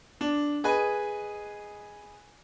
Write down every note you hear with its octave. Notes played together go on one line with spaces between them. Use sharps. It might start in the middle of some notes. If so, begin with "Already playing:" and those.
D4
G#4 B4 D#5 G#5